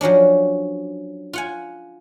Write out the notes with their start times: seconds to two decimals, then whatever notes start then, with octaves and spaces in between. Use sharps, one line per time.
0.01 F3 F#3 C#4 D4
1.33 F4 F#5 G#5